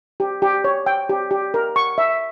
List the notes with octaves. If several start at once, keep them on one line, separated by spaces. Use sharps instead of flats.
G4
G4
C#5
G5
G4
G4
A#4
C#6
E5